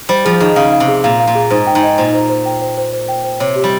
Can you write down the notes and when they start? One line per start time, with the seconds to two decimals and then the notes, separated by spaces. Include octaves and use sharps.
0.09 G3 C5
0.25 F3 G#4
0.40 D#3 G#4
0.56 C#3 F5
0.72 F5
0.80 C3
0.88 G#4
1.04 A#2 F5
1.20 F5
1.27 A#2
1.35 G#4
1.50 G#2 C5
1.67 G5
1.75 G#2
1.83 D#5
1.98 A#2 C5
2.14 C5
2.29 C5
2.45 G5
2.61 C5
2.77 C5
2.93 C5
3.08 G5
3.24 C5
3.40 C3 C#5
3.56 G4
3.64 G3